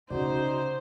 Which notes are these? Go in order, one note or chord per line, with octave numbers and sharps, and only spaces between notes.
C#3 C#4 D#4 F#4 C5 D5